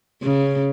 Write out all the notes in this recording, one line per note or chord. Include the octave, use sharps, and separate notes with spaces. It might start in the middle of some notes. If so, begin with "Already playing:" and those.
C#3